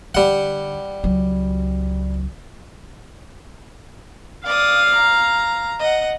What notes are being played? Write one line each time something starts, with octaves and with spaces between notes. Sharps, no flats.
D3 G3 F#5
C#2 F#3
D5 F5 D#6
A#5
D#5 F#5